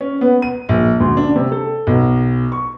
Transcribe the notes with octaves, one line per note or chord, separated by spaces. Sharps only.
C#4
B3
D#7
A#1
D2
D4
C3
A4
B1
C#6